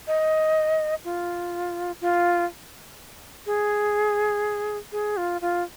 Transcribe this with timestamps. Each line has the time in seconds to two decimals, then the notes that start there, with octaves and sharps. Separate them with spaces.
0.07 D#5
1.05 F4
2.01 F4
3.46 G#4
4.92 G#4
5.17 F4
5.41 F4